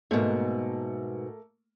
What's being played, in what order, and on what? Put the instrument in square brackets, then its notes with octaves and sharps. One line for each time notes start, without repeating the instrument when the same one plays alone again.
[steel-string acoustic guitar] G#2 B2 [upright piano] A3 A#3